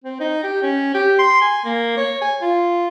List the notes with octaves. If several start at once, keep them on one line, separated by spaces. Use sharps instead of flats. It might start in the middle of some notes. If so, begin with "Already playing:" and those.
C4
D#4
G4
C#4
G4
C6
G#5
A#3
C#5
G#5
F4